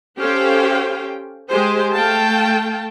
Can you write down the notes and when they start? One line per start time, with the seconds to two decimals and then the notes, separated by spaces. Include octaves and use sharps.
0.19 C#4 G4 A4 C5 F5 G5
1.49 G#3 G4 G#4 C5
1.94 A3 F5 G5 A5